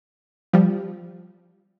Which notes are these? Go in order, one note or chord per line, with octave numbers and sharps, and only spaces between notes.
F3 G3